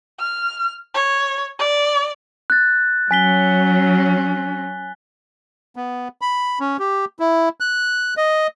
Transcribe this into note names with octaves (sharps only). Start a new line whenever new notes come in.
F6
C#5
D5
F#6 A6
F#3 C#4 G#5 B6 G7
B3
B5
C#4
G4
E4
F#6
D#5